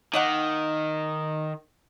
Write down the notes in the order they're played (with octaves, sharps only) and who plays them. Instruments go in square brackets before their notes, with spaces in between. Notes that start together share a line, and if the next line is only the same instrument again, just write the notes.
[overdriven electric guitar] D#3 [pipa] A#3 D#5 F#5